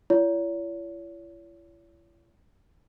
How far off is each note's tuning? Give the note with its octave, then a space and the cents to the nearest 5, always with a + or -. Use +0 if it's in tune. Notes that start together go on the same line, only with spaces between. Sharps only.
E4 +45 C#5 +40